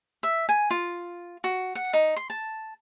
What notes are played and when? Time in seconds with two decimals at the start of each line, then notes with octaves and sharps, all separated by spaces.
0.23 E5
0.49 G#5
0.71 F4
1.44 F#4
1.75 F#5
1.93 D#4
2.16 C6
2.30 A5